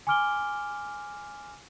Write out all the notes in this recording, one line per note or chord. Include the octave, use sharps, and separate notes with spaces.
G#5 C6 D6 F6 D7 G7